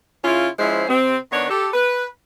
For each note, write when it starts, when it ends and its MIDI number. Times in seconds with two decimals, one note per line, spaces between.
0.24 0.47 49
0.24 0.47 61
0.24 0.47 64
0.24 0.47 65
0.59 0.85 53
0.59 0.85 56
0.59 0.85 61
0.59 0.85 64
0.59 0.85 72
0.89 1.16 48
0.89 1.16 60
1.32 1.46 51
1.32 1.46 59
1.32 1.46 62
1.32 1.46 73
1.50 1.68 67
1.50 1.68 69
1.73 2.05 71